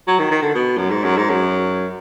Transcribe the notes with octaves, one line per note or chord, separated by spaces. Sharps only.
F#3
D#3
D#3
D3
B2
F#2
G#2
F#2
G#2
F#2